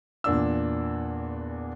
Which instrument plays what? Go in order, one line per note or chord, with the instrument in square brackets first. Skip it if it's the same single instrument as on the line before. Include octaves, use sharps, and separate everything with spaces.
[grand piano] E2 A#2 D4 E6